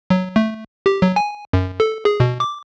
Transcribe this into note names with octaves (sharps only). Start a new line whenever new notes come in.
F#3
A3
G4
F#3
G#5
F#2
A4
G#4
B2
D6